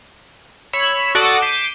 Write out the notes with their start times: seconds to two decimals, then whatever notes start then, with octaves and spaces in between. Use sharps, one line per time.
0.73 C#5 B5 E6
1.15 F#4 A4 D5 F#5 D6 D#6
1.42 D6 G6 B6 C7 D#7 E7